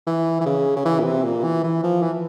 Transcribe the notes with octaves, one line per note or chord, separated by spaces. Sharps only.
E3
E3
C#3
C#3
E3
A#2
C3
A#2
E3
E3
F3
E3